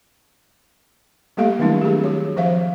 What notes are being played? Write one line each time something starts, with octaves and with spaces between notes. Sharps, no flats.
G3 A3 A#3 G4 A4 F5
D#3 F#3 A3 C4 D4 E4
G4 G#4
F#4 C#5
F3 C5 E5 F5